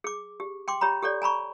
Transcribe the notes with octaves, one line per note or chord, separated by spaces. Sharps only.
G#4 D6
G4
G5 C6 D6
G4 C#5 A#5 B5
G4 A4 C#5 D5
G#5 A#5 B5 C#6